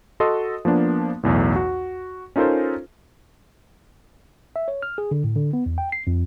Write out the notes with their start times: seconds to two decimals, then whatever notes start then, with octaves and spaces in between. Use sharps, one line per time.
0.20 F#4 A4 D#5 C6 D#6
0.65 F3 A#3 B3 D4
1.23 B1 E2 A2
1.56 F#4
2.36 C#4 D#4 F4 A4 A#4 C5
4.56 E5
4.68 C#5
4.82 F6
4.98 G#4
5.11 D3
5.24 A2
5.36 D3
5.53 B3
5.66 E2
5.78 G5
5.92 C7
6.07 F2